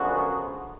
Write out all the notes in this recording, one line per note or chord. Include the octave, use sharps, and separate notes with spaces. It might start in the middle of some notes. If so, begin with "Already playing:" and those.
Already playing: F#2 D3 F3 G#3 B3 F#4